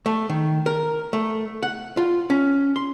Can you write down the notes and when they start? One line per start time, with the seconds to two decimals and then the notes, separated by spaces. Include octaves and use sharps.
0.06 A3
0.29 D#3
0.66 A#4
1.13 A3
1.63 F#5
1.97 F4
2.30 C#4
2.76 C6